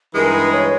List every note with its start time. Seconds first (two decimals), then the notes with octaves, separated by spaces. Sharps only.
0.14 G2 E3 G#3 D#4 G#4 A#4
0.34 B4
0.53 C#5